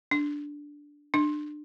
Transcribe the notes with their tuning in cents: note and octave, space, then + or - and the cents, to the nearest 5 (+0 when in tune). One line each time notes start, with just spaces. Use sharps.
D4 -5
D4 +25